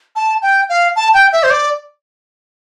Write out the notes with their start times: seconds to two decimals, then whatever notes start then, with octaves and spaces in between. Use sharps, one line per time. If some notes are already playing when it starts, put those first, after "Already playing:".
0.16 A5
0.42 G5
0.69 F5
0.96 A5
1.14 G5
1.33 E5
1.43 C5
1.50 D5